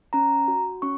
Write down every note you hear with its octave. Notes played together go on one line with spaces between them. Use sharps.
C#4 A#5
F#4
C#4 C#6